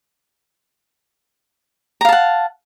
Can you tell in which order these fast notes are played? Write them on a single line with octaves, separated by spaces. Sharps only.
A#5 F5 A5 F#5